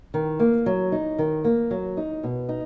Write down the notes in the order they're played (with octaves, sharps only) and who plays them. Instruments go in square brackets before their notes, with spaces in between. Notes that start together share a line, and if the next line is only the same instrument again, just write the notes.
[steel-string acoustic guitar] D#3
A#3
F#3
D#4
D#3
A#3
F#3
D#4
B2
D#4